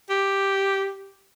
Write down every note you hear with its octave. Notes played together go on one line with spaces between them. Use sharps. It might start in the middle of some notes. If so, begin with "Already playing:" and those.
G4